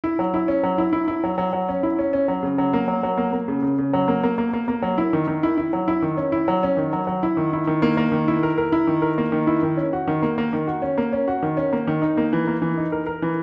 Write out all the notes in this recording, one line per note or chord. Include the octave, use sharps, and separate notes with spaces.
E4
F#3
E4
C#4
F#3
E4
E4
E4
F#3
F#3
F#3
C#4
E4
C#4
C#4
F#3
C#3
F#3
A#3
F#3
F#3
A#3
A#3
C#3
C#3
C#3
F#3
A#3
A#3
A#3
A#3
A#3
F#3
E4
D#3
D#3
E4
E4
F#3
E4
D#3
C#4
E4
F#3
C#4
D#3
F#3
F#3
E4
D#3
E4
D#3
A#3
A#3
D#3
E4
A#4
A#4
E4
D#3
A#4
A#3
D#3
E4
D#3
C#4
F#4
D#3
A#3
A#3
D#3
F#4
C#4
A#3
C#4
F#4
D#3
C#4
A#3
D#3
D#4
A#3
E3
A#3
E3
D#4
A#4
A#4
E3